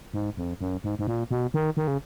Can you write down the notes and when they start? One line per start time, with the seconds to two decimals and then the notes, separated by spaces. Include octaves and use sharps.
0.14 G#2
0.37 F2
0.61 F#2
0.84 G#2
0.99 G#2
1.07 A#2
1.31 B2
1.54 D#3
1.77 D#3
1.88 C#3